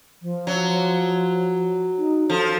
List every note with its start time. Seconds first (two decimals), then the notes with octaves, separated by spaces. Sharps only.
0.22 F3
0.47 F#3
1.98 D#4
2.30 F3 A4